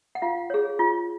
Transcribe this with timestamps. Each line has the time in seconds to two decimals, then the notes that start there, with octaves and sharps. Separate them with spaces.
0.15 F#5
0.22 F4 F5
0.50 G#4 C#5
0.79 F4